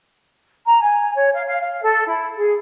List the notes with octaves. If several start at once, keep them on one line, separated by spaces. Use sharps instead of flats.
A#5
G#5
C#5
F5
F5
F5
A4
E4
G#4